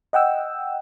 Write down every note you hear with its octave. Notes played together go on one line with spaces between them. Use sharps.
D#5 F#5 G5 E6